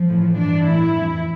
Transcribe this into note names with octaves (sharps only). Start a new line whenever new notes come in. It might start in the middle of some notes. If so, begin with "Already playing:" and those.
Already playing: F3
A2 E3
G2 E3 D4
A2 E3 E4
F2 E3